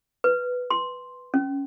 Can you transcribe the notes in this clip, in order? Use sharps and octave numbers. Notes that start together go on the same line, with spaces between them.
B4
C6
C#4